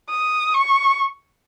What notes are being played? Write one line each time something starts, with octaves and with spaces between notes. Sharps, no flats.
D#6
C#6